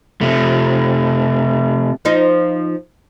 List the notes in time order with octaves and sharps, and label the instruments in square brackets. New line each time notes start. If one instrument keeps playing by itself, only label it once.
[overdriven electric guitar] C3 A3
[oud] F3 D#4